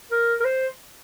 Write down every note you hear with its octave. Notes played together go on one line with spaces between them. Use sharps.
A#4
A#4
C5